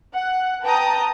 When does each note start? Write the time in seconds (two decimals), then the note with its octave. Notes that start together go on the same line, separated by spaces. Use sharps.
0.13 F#5
0.63 B4 G5 A5 A#5 D#6